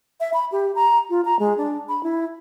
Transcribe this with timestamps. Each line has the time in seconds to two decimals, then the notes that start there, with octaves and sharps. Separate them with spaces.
0.20 E5
0.34 B5
0.52 G4
0.75 A#5
1.10 F4
1.25 A#5
1.39 G#3
1.57 D4
1.89 B5
2.03 E4